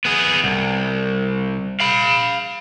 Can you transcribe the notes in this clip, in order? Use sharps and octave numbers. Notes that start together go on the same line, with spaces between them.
B3 G#4
C2
F5 B5